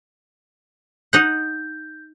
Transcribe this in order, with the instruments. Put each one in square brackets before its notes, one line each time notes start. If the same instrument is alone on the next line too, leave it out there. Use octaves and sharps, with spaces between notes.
[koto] D#4 F#5 [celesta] G6